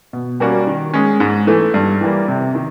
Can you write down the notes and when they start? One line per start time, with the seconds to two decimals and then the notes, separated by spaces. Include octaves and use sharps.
0.13 B2
0.40 G3 A#3 C#4 F#4
0.67 D#3
0.94 G#3 C#4
1.20 G#2
1.47 E3 A3
1.74 G2
2.01 E3 G3 A#3
2.28 C3
2.55 D#3